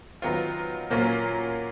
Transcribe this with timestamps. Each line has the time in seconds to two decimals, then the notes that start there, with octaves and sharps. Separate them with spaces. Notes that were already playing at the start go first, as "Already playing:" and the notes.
0.22 D#3 F#3 B3 F4
0.90 A#2 F#3 A#3 C#4 F4